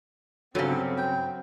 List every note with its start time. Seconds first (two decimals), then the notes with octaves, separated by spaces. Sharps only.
0.55 G2 C#3 F#3 B3 C4 A4
0.98 G5